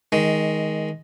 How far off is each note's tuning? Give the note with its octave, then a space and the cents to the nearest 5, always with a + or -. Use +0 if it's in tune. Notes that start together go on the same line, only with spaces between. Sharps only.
D#3 +20 G#3 +0